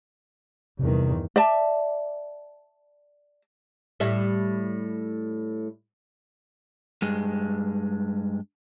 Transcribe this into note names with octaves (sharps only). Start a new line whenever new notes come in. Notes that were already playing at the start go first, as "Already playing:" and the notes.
E2 G2 C3 D#3
D5 E5 A5
A2 G3 E5
G2 G#3